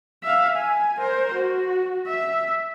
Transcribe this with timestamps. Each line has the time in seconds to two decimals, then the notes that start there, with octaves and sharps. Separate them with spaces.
0.23 E5 F5
0.56 G#5
0.98 A#4 C5
1.34 F#4
2.07 E5